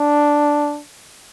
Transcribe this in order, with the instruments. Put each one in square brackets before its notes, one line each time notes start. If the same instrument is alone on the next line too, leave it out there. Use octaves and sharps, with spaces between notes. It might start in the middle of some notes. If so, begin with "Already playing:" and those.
Already playing: [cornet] D4